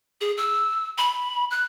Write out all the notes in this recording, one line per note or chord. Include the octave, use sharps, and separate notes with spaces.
G#4
E6
B5
F#6